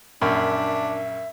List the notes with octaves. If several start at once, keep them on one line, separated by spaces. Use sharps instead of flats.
A#1 F#2 D4 E5